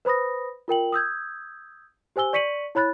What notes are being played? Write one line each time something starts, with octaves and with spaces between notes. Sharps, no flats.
B4 C5 B5 D#6 A#6
F4 A#4 G5 F#7
D#6 E6 G6 G#6
G4 C5 G#5 E6 G7
D5 C#6 B6 C#7 D#7 F#7
E4 C#5 B5 F#6 A6